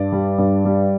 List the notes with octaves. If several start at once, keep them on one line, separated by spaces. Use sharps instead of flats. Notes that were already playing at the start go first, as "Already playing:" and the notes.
Already playing: G2 D5
G3
G2
G3